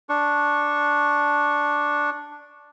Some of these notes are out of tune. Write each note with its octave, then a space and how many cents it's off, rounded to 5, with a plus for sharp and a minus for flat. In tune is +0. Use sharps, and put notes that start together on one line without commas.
D4 +0 C#6 -10